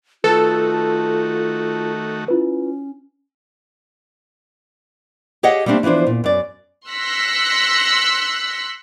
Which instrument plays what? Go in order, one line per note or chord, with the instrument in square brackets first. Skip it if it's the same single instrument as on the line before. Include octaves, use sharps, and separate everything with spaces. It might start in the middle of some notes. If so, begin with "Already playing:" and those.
[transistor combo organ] D#3 A3 F#4 [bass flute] F4 [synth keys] A4 [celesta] B4
[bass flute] C#4 [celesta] E4 F4 B4
[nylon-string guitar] G4 G#4 C#5 D#5 F5 F#5
G3 A3 A#3 C4 D4
E3 F3 B3 D4 C5
A#2
F#2 D5
[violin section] C6 E6 F#6 A#6 B6 C#7